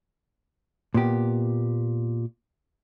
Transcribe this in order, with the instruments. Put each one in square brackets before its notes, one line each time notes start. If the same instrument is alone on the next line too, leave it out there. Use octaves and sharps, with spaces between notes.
[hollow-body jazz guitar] A#2 B3 G4